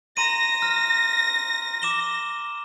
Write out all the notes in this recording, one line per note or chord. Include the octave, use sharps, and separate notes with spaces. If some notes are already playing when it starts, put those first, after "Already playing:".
A#5 C6 A#6 D#7
A#5 F6
D6 E7 G7